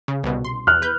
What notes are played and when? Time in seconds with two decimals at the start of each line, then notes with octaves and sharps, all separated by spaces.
0.08 C#3
0.24 C2 B2
0.45 C6
0.67 E2 F6 F#6
0.82 B4 G6